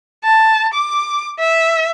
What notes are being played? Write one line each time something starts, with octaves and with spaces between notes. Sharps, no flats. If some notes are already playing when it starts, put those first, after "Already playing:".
A5
D6
E5